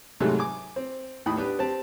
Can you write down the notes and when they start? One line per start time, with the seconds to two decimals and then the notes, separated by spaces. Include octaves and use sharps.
0.20 C2 G#2 C3 F#3 A3 G#4
0.39 G#5 D6
0.76 C4
1.26 D#2 A2 B5 D#6
1.37 B3 D4 G4
1.59 C4 G4 A5